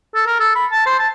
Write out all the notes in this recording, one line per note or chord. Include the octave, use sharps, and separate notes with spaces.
A4
A#4
A4
B5
A5
C5
A5